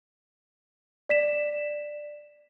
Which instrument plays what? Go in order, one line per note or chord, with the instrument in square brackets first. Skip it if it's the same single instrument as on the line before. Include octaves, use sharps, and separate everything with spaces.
[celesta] D5 B6 E7